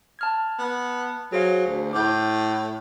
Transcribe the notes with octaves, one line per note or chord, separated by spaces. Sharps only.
A5 F6 G#6
B3
F#3 G#4 C5 F5
D2
A2 D6 G6